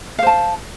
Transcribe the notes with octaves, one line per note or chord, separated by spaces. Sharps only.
C5 F5 A5